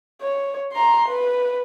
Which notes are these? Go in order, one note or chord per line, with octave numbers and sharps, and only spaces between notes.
C#5
A#5 C6
B4